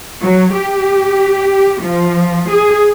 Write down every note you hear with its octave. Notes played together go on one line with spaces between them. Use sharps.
F#3
G4
F3
G#4